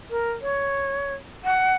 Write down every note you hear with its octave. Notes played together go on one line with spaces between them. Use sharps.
A#4
C#5
F#5